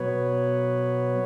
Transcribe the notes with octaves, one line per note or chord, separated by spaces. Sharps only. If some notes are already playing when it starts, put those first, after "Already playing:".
Already playing: B2 F#3 B3 B4 C#5